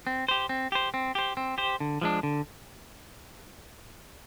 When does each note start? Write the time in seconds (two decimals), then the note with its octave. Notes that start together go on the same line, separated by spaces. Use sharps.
0.07 C4
0.28 G4 C5
0.49 C4
0.72 G4 C5
0.94 C4
1.15 G4 C5
1.37 C4
1.58 G4 C5
1.80 D3
2.01 F3 G#3 D4
2.23 D3